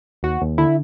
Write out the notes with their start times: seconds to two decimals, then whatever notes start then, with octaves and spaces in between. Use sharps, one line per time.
0.23 D#2 F#4
0.42 D#2
0.58 D3 E4